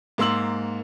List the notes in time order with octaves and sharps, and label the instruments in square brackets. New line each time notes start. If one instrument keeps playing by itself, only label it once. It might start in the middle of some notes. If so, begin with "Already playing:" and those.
[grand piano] G#2 A#3 C6 E6 F#7